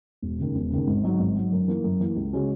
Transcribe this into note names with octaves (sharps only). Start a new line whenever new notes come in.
E1
D#2 C#3
E1
D#2 C#3
G#1
G#2 F#3
G#1
G#2 F#3
F#2
E3 A#3
F#2
E3 A#3
C#2
C#3 G#3 C#4 F#4